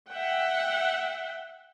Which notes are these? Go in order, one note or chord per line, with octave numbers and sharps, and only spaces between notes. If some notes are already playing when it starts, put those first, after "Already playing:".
E5 F#5 G5